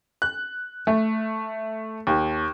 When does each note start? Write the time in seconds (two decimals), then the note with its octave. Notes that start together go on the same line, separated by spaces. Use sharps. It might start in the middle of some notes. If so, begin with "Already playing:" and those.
0.22 F#6
0.87 A3
2.07 D#2